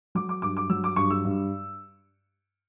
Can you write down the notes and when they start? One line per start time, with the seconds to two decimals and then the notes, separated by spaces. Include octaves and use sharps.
0.15 F#3 D6
0.29 D6
0.42 G2 D6
0.57 D6
0.70 F#3 E6
0.84 D6
0.96 G2 C#6
1.11 E6
1.25 G2